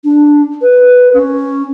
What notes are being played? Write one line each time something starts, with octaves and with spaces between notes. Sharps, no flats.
D4
B4
C#4